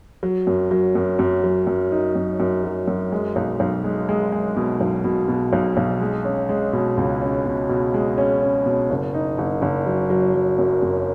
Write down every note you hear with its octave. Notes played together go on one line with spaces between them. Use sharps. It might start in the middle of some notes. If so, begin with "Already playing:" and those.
F#3
F#2
F#3
F#2
F#2
F#3
F#2
D#4
F#2
F#2
F#3
F#2
G#3
B1
B1
G#3
G#3
G#3
B2
B1
B2
B2
B1
B1
G#3
C#4
G#3
B2
C#2
C#4
B2
B2
G#3
C#4
C#4
B2
F#1
D#4
F#1
F#1
F#3
F#3
F#3
F#2
F#2